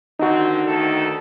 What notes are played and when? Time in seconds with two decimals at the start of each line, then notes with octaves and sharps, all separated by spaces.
0.19 D3 D#3 C4 D#4 F#4
0.67 D2 D#3 A4